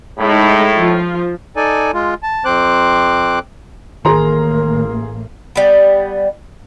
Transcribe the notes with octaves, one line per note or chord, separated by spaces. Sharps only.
A2 G#3 D#4 B5
F3 F4
D#4 A4 D5 G#5
G#3 F4
A5
F2 C4 C5 D6 F#6
A1 A2 D#3 A#3 G#4 A#4 A#5 C6
G3 B3